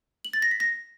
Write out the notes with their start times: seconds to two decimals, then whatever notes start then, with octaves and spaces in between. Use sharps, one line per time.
0.25 F#7
0.33 A6
0.42 A#6
0.51 B6
0.60 A#6